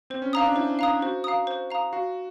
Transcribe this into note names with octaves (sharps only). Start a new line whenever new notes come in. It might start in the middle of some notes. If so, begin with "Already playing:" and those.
C4 C5
C#4
D4 F5 A#5 D#6
D4
E4 C5
F5 A#5 D#6
F#4 C5
F5 A#5 D#6
C5
F5 A#5 D#6
F#4 F5